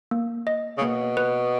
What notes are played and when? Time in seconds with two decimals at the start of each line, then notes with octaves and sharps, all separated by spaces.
0.11 A#3
0.47 D#5
0.78 C#3
0.81 B2 A#3
1.17 B4